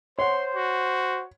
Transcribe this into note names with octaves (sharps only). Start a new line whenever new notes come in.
C5 C#5 F#5 C6
F#4